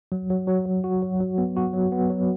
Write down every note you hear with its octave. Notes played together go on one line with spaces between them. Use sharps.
F#3
F#3
F#3
F#3
F#4
F#3
F#3
B3
F#4
F#3
B3
F#3